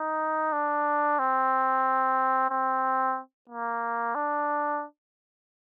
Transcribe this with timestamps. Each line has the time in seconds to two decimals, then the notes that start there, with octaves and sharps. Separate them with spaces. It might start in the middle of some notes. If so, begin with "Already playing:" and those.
Already playing: D#4
0.53 D4
1.19 C4
2.50 C4
3.50 A#3
4.15 D4